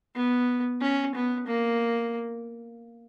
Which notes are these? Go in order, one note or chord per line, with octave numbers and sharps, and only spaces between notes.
B3
C#4
B3
A#3